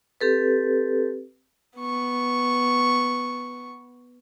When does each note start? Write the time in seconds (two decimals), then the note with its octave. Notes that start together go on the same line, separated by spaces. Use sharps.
0.21 C4 G4 A4 B4
1.79 B3 C#6